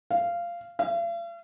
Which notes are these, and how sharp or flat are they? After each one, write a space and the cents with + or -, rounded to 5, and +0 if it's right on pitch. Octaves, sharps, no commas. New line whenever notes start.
F5 -15
F5 -45